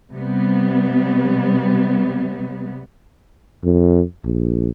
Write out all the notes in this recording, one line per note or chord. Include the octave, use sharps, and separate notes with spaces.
C3 G3 B3
F2
A#1